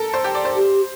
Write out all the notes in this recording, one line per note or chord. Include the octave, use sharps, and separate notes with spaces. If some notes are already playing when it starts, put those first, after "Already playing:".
Already playing: A4 A#4
C5
G4
D5
C5
G4